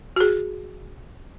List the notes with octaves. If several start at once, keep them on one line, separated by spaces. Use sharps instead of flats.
F#4 G#4